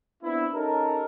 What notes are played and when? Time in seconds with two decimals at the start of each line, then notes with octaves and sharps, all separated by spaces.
0.23 B3 C4 D4 E4
0.54 C#4 D#4 G4 A4 A#4